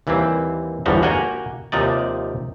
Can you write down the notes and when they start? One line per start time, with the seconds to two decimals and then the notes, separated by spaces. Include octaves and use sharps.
0.07 D#2 E3 G3 A#3 C4
0.86 G1 E2 F3 G3 F#4 A#5
1.03 A#3 F#4 G4 G5 G#5 A#5
1.72 D#2 C3 F3 D#4 D5